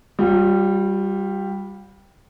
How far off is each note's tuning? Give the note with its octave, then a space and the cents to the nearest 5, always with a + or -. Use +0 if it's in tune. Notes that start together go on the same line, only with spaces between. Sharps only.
G3 +0 F4 +40